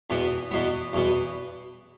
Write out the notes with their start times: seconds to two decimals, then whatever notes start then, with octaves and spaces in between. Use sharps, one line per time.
0.10 E2 B2 B3
0.51 E2 B2 B3
0.93 E2 B2 B3